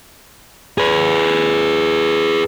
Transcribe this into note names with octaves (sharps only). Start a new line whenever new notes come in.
G#4 B4